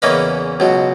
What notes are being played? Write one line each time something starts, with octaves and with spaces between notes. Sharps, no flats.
E2 C#3 E3 A#3 C#4 B4 D#5
C#2 B2 F#3